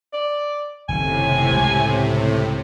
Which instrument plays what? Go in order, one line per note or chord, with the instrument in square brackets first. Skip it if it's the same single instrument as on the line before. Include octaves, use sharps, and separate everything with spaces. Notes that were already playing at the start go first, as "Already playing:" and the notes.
[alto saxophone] D5
[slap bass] F#1 D#3 [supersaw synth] A2 C3 [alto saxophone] G#5
[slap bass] C#2